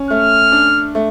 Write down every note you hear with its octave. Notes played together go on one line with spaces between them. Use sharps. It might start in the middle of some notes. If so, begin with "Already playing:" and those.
Already playing: C#4
A3 F6
D4
A3